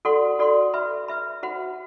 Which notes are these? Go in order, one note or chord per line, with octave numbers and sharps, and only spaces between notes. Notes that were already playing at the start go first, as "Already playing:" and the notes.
F#4 A4 D5 F#5 C6
F#4 A4 D5 F#5 C6
B4 E5 B5
B4 E5 B5
F#4 C5 F#5 B5